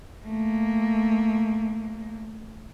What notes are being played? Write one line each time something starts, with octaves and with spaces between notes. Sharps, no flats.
A3 A#3